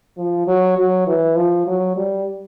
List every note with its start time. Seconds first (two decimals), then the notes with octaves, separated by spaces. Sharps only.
0.17 F3
0.47 F#3
0.78 F#3
1.07 E3
1.36 F3
1.67 F#3
1.97 G3